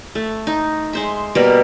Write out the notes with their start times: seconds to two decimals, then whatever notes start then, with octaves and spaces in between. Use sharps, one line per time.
0.15 A3
0.47 D#4
0.93 G#3 C5 E5
1.35 B2 G3 A#3 A#4